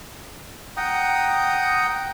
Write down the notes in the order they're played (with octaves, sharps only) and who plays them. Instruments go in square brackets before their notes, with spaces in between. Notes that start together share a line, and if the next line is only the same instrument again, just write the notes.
[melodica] F#5 G5 A#5 D#6